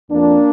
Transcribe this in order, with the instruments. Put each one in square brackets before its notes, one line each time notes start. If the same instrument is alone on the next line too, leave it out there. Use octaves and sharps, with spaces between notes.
[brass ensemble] F2 F3 A#3 D4